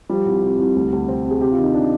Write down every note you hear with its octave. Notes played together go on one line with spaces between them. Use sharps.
F3 G3
C2
C3
C2
D2
D2
C3 C4
C3
G#4
C3 G4
F4
D#3
D#4
D#3 D4